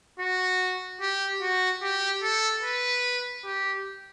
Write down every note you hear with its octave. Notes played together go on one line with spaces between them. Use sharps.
F#4
G4
F#4
G4
A4
B4
G4